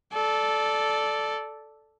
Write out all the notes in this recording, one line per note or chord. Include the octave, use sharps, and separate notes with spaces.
A4 D5